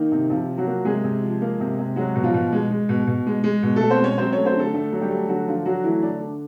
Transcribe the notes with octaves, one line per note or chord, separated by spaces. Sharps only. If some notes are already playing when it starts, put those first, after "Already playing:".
Already playing: D#3 A#3 D#4
C3
C3 F3 F4
F3
F#3 F#4
A#3
C3 G#3 G#4
C3
F3
A#3
C3
C3
F#3 G#3 F#4
B2
F3 F4
B2
G#3
G#3
B2
B2
G#3
G#3
B2
B2 A3 A4
C4 C5
G#3 C#4 C#5
F#3 C4 C5
A3 C#4 C#5
C4 C5
D3 A3 A4
D3 A3 A4
F#3
G3 G4
A3
D3 F#3 F#4
D3 F3 F4
F#3 F#4
E3 A3 E4
D3 D4
D3